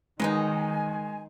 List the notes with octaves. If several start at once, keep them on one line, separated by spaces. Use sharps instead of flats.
D#3 F#3 G#3 B3 D#4 G#5